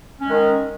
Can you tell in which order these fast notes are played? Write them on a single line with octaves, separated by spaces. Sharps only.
C#4 G#3 D#3